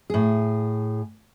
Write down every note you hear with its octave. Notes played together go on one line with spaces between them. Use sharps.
A2 G#4